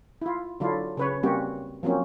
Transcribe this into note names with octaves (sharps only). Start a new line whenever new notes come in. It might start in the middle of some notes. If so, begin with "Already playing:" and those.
E4 F4
D3 F#3 D4 E4 F4
C#3 B4 C#5
G3 A#3 C4 C#4 F#4 G4
F3 F#3 A#3 C4 C#4